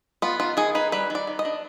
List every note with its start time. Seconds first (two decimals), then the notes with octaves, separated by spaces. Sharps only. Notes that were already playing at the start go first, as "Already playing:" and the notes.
0.22 B3 F4
0.40 D#3 F4
0.57 D#3 G#4
0.75 D#4 B4
0.92 G3 B4
1.10 D#3 D5
1.27 D#3
1.39 D#5
1.45 D4